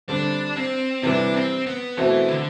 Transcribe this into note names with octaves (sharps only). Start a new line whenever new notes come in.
D3 G3 C4 D4
C4
C3 E3 G3 D4
C4
B3
B2 E3 A3 C4
D3